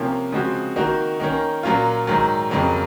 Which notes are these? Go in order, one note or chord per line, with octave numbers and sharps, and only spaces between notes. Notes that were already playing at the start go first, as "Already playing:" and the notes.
Already playing: C3 F3 A#3 C#4
C#3 F3 G#3 C4 F#4
D#3 A#3 D#4 F#4
D#3 A#3 C#4
A#2 F#3 A#3 C#4 F4
G#2 D#3 F#3
F2 C#3 F#3 A#3